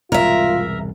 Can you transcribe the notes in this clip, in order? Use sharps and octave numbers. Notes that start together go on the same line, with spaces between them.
E1 C2 G#2 F4 A#4 E5